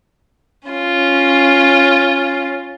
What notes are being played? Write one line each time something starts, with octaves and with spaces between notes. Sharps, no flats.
C#4 F4